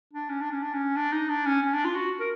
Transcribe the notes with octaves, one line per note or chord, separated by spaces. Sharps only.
D4
C#4
D4
C#4
D4
C#4
D4
D#4
D4
C#4
C#4
D4
F4
F#4
A#4